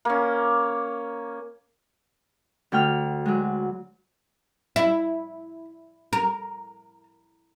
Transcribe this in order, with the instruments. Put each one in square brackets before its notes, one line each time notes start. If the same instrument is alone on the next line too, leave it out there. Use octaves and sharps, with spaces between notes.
[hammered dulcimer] A#3 C#4
[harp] D2 A3 G5 F6
F#3 G#3
[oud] E4
A#4